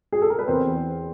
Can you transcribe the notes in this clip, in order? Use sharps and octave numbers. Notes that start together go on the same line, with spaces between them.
G#4
A4
A#4
B4
E2 C4 C5